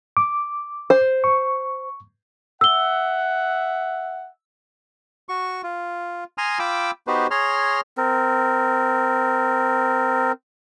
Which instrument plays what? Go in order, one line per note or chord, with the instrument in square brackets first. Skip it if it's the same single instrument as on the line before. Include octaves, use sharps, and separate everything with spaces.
[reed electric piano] D6
[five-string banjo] C5
[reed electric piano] C#6
[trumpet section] E5 F#5 [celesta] E6 G7
[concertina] F#4 C#6
F4
G#5 A#5 C6 D#6 F6
F4 G5 B5 D6 E6
B3 D#4 F#4 G4 B4 C5
G#4 C#5 A#5 C6 F6
[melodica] C4 A#4